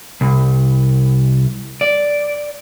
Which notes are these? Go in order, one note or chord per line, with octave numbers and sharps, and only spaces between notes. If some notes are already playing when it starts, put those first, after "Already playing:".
C2
D5